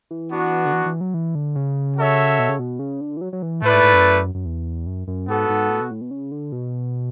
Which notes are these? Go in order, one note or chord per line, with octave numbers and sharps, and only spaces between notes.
E3
B3 D4 F#4
D3
E3
E3
F#3
E3
D3
C#3
F#4 A4 C#5 E5
B2
C#3
B2
C#3
D3
E3
F#3
F#3
E3
A2 A3 E4 B4 D5
G#2
G#2
F#2
F#2
E2
F#2
F#2
G#2 B3 F#4 A4
G#2
A2
B2
A2
B2
C#3
D3
B2